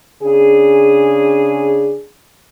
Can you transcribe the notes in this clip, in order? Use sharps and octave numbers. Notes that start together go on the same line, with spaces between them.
C#3 D4 G#4